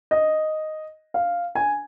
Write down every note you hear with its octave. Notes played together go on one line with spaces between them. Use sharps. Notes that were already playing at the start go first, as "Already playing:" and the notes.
D#5
F5
G#5